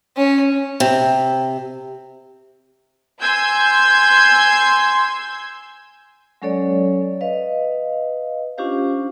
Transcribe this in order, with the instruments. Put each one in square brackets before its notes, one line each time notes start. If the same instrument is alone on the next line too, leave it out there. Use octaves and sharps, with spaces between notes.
[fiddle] C#4
[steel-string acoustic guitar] C3
[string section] G#5 C6 E6 G6 G#6
[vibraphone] F#3 G#3 C#4 A4 C#5 D5
B4 D#5 F5
C#4 D4 F4 G4 C5 F5